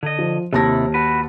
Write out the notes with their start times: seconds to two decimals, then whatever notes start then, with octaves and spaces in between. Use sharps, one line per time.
0.03 D3 D#5
0.19 F3
0.53 D#2 C3 D#3 E4 A5 A#6
0.94 F#4 B4